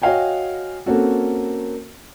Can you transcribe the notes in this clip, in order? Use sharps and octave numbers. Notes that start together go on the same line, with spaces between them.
F#4 C#5 D#5 F5 G5 G#5
A#3 C4 C#4 F#4 A4